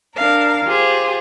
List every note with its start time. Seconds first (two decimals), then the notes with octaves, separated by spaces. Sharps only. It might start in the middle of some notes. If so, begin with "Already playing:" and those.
0.16 D4 A#4 F5
0.65 F4 G4 G#4 C5